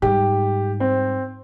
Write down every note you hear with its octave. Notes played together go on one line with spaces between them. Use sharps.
G#2 G3 G4
C4